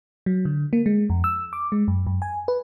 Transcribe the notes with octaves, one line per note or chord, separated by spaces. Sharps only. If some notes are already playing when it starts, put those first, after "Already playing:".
F#3
D3
A#3
G#3
F2
E6
D6
G#3
F#2
F#2
G#5
B4